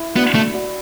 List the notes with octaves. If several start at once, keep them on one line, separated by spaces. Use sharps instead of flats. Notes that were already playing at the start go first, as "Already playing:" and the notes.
Already playing: E4
B3 D4 F#4
A3
D4 F#4